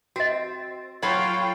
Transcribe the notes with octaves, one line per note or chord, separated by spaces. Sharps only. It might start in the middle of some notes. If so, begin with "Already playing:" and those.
C4 F#4 D#5
F#3 F4 A4 C#5 F5 G5 B5 C#6